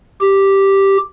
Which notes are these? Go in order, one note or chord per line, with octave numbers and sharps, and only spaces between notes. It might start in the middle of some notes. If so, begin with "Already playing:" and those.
G4